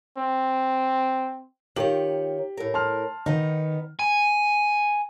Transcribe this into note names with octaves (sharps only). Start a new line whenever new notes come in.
C4
D#3 F4 G4 C#5 F#7
A2 A#4
A5 C6 F6
D#3 B3 D#4
G#5